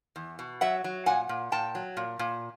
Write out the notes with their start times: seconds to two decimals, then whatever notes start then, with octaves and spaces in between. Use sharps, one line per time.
0.16 E2
0.39 B2
0.61 F#3 E5 F#5
0.84 F#3
1.06 A#2 F#5 G#5
1.29 A#2
1.52 A#2 G5 A5
1.75 F#3
1.97 A#2
2.19 A#2